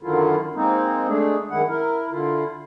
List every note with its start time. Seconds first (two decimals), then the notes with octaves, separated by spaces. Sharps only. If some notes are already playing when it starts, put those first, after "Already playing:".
0.03 F#2 D3 D#3 F#3 E4 F4
0.55 G#3 A#3 C4 D#4
1.08 G#3 A3 D4 G#4
1.51 F#2 D#3 G#3 E4 F#5
1.69 E4 A#4
2.12 D3 E4 F4